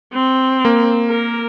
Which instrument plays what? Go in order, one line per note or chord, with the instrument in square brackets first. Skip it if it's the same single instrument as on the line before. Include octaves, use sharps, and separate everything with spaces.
[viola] C4
[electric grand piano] A#3
[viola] A#4